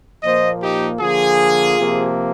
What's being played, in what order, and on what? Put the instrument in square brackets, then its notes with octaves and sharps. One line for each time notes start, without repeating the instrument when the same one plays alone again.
[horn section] A#2 F3 A#3 C5 D#5
D#4 G4
D3 F3 A#3 F4 G#4
C3 F3 A#3